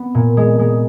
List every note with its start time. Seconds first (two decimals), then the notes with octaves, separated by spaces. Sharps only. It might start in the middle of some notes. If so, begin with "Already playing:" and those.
Already playing: B3
0.14 A#2
0.37 G#3
0.59 G#3